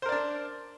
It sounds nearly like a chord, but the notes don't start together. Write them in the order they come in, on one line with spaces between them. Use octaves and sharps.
C5 A#4 D5 D4